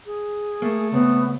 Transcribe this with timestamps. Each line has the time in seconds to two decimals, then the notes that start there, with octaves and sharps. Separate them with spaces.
0.06 G#4
0.62 A3 A#3
0.92 C#2 B2 B3 C4